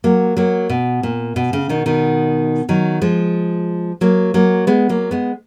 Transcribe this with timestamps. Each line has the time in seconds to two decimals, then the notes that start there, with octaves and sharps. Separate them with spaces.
0.04 F#3 A#3
0.37 F#3 A#3
0.70 B2
1.03 A#2
1.36 B2
1.53 C#3
1.69 B2 D#3
1.86 B2 D#3
2.69 D#3 F#3
3.02 F3 G#3
4.01 F#3 A#3
4.34 F#3 A#3
4.67 G#3 B3
4.89 F#3 A#3
5.11 G#3 B3